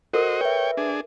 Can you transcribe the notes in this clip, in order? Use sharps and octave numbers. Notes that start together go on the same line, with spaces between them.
F#4 A4 A#4 C5 D#5
B4 C#5 E5 G5
D4 G#4